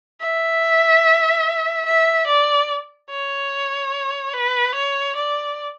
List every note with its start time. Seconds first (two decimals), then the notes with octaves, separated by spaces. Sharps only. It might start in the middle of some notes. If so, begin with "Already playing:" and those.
0.21 E5
1.86 E5
2.27 D5
3.10 C#5
4.33 B4
4.75 C#5
5.16 D5